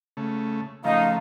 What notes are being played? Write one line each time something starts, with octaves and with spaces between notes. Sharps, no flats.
C#3 A3
C#3 F3 A3 D#4 F5